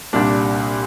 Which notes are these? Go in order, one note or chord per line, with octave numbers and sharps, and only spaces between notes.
C2 A#2 G3 D4